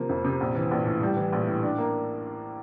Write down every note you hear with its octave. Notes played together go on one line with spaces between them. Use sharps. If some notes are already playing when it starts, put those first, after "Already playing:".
Already playing: C3 F3 A#3
F2
C3
A#1
E3
A#1
A2
G3
E3
A#1
A2
D4
A#3